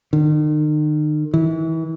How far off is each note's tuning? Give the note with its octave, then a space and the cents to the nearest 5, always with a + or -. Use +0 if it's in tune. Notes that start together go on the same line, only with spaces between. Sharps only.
D#3 -40
E3 -30